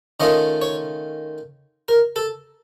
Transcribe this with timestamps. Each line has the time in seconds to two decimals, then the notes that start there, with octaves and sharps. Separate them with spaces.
0.20 D#3 A3 C#4 F4 D#5
0.62 C#5
1.88 A#4
2.16 A4